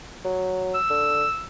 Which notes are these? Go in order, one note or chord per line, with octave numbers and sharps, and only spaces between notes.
F#3
E6
D3